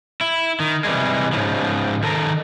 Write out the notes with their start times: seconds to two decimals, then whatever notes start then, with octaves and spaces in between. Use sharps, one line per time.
0.21 E4
0.60 D#3
0.85 C3 E3 G3 G#3
1.32 G#2 C#3 F3
2.03 D#3 A4 A#4